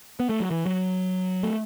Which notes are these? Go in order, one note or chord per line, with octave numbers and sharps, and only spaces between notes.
B3
A3
F#3
E3
F#3
A3